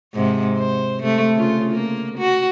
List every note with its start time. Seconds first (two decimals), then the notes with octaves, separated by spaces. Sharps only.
0.14 G#2 C3
0.58 C5
1.03 C3 A3
1.36 C#3 F4
1.73 A#3
2.18 F#4